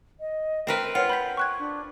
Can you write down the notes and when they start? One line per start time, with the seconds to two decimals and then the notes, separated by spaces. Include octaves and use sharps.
0.20 D#5
0.67 C4 A#4 B4 G5
0.95 F4 B4 C#5 F#5
1.09 B5 G6 B6
1.37 C#6 F#6 G#6
1.59 D4